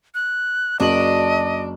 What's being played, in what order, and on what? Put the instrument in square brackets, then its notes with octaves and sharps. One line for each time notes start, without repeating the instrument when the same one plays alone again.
[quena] F#6
[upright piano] F#1 F#4 F#7 [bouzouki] D4 [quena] D#5